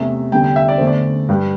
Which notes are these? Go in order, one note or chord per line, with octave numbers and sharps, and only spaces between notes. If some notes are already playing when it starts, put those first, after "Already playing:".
Already playing: E2 C3 A3 E5
E2 D3 G3 G5
G5
E5
D5
E2 D3 A3 C5
D5
G2 G3